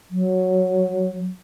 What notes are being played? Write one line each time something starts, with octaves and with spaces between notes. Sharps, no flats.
F#3